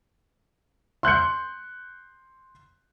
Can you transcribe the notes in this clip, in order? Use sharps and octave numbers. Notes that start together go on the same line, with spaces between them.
C6 F#6 G6 C#7